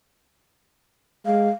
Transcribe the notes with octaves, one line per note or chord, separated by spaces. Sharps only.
G#3 F5